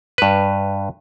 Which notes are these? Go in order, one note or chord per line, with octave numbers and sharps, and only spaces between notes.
G2 B4